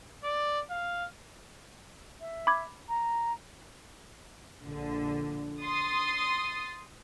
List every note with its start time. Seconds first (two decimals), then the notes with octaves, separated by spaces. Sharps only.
0.24 D5
0.70 F5
2.20 E5
2.47 B5 D6 G#6
2.88 A#5
4.62 A#1 D3
5.62 C6 D#6 A6